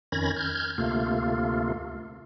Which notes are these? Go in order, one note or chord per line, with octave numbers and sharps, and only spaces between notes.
F2 D#3 C#4 B5 G#6 A#6
F6 G6 G#6
D2 C3 A3 A#3 F4